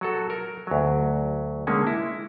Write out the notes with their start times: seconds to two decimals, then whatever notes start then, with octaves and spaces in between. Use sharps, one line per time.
0.01 F#3 F#4 A4
0.30 A#4
0.67 D2 F#3
1.67 D3 G#3 A#3 C#4
1.87 E4